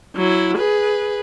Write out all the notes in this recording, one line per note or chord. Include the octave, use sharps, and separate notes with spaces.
F#3 E4
G#4 B4